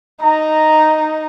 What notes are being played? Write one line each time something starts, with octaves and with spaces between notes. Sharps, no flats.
D#4 A#5